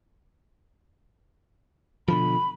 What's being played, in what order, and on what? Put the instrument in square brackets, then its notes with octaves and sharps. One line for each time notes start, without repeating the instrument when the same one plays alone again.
[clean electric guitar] B2 D3 F3 [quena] B5